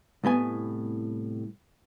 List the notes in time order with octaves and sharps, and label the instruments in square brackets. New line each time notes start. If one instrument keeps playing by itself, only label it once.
[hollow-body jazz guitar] C2 A2 B3 G#5